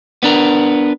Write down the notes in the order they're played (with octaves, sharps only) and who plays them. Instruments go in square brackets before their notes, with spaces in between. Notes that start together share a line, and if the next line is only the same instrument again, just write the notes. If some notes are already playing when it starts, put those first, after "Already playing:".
[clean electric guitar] B3 D4 A#4